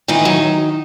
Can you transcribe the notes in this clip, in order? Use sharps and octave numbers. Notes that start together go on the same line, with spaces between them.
D#3 E3 D#4
F#3